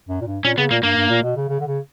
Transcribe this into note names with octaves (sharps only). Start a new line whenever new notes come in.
F#2
A#2
G2
A#2 C#4
C#3 B3
A#2 A#3
G2 A#3
G2
A#2
B2
C#3
C#3
D3
C#3